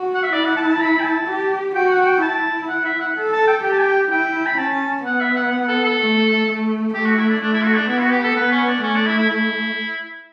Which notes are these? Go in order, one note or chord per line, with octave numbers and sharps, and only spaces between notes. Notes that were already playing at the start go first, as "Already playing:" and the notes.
Already playing: F#4
F#5
E5
E4 D5
F#5
A5
A5
B5
G5
A5
G4
F#4 G5
F#5
G5
E4 A5
F#5
E5
F#5
A4
A5
G5
G4 G5
A5
G5
E4 G5
B5
C#4 A5
B3 F#5
E5
F#5
F#5
A4
A4
A3
A3
A3 G4
F#4
E4
D4
A3 D4
E4
F#4
D4
B3 E4
F#4
G4
A4
B3 B4
C#4
D4
A3 C#4
D4
E4
E4
E4